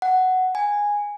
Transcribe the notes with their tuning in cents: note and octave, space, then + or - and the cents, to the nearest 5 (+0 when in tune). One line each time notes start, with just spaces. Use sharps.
F#5 +5
G#5 -10